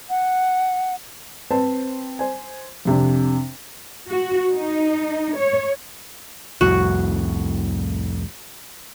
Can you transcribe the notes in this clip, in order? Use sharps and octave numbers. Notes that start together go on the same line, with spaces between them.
F#5
C4 B4 C5 A5
C5 G#5
F2 C3 D4
F#4
D#4
C#5
C2 F2 A2 F#4